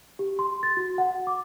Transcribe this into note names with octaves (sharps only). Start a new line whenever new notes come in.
G4
C6
A6
F#4
F#5
D6